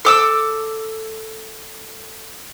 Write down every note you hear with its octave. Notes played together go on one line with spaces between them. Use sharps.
A4 D6 E6